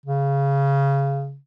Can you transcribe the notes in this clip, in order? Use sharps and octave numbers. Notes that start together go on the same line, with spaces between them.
C#3